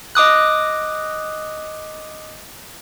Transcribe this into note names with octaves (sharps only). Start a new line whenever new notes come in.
D#5 D6 D#6 F#6